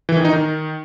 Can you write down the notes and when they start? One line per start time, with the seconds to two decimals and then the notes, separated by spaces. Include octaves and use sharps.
0.09 E3
0.17 D#3
0.25 D#4
0.33 D#3